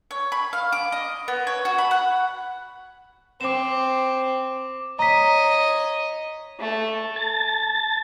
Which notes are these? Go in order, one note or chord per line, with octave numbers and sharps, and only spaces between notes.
C#5
B5
F5
D6
D#5
B3
C#5
F#4
B5
F#5
C4 D6 E7
C#5 D#5 A#5 B6
A3
A5 A6